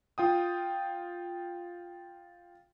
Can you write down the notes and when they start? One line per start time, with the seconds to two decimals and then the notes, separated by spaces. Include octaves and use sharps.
0.18 F4 G5 D#6